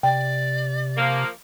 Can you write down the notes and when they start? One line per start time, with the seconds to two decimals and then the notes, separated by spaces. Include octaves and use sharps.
0.03 C3 D5 G5
0.96 F3 A#3